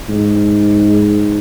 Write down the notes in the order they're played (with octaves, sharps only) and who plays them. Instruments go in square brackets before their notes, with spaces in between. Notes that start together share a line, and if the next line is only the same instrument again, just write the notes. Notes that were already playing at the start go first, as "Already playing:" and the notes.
[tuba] G#2